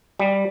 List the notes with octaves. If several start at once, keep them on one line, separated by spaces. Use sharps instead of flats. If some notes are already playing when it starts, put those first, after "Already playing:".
G3